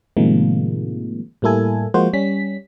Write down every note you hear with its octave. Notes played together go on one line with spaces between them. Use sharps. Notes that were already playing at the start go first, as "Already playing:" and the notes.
A2 C3 D#3 F3 G#3 A#3
A2 G3 A#3 E4 A4 G#5
F3 G#3 A#3 F#4 C5
G3 C#4 B6